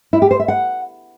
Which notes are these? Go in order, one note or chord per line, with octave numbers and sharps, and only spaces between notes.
E4
G4
C5
E5
F#5